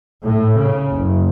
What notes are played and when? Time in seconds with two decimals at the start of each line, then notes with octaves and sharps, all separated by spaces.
0.23 A2
0.58 C#3
0.92 F#1